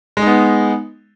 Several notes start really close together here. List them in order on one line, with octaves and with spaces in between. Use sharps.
G#3 D#4 B3